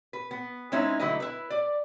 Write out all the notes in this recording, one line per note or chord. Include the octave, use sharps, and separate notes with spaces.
B4
B3
G#3 C4 C#4 D#4 E4
D3 F#3 A3 E4 B4 D#5
E4 B4
D5